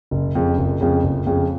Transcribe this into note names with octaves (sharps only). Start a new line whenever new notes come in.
F#1
F2 C#3
F#1
F2 C#3
F#1
F2 C#3